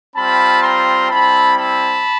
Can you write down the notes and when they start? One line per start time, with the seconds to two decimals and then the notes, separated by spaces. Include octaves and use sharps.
0.15 G3 C4 F4 A5 B5
0.63 A#5 C6
1.09 G3 C4 E4 A5 B5
1.56 A5 B5